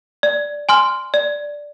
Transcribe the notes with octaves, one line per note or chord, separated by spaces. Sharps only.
D5
G#5 C6 F6
D5